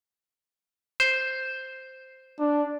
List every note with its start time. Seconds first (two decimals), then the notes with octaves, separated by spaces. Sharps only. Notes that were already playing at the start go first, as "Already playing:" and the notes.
1.00 C5
2.40 D4